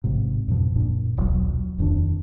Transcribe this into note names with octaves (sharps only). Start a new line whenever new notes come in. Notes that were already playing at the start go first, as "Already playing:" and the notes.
A1 G#2 C3
F2 G#2 B2 F3
F#2 A#2 D4
D#1 B1 A2 F#3
D#1 F2 D#3 D4